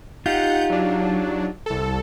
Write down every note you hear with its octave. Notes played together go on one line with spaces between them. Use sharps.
D#4 F4 G4 F#5 G6
F#3 D4
C2 A4